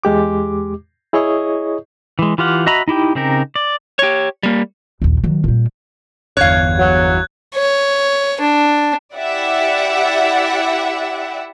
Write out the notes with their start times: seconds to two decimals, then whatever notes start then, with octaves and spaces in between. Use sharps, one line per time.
0.04 E2 G#3 G4 D6
1.13 E4 G#4 C#5 D#5 C#6 D#6
2.19 E3 G#3
2.38 E3 F4 G4 F5 F#5
2.66 F#4 D#5 E5 A#5 B5
2.88 D#4 E4 G4 G5
3.15 C#3 C4 D#4 G4 A#4
3.56 D5
3.99 G4 C#5
4.43 G3 A#3
5.02 A#1 D#2
5.24 D#3 F#3
5.44 A#2 G3
6.37 G1 E2 C#5 F5 F#6 G#6
6.79 F#3
7.55 C#5
8.41 D4
9.16 E4 G4 D5 E5 F#5